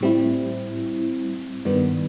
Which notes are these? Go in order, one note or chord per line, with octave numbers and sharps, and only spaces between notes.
A2 G3 C4 E4
G2 D#3 G3 B3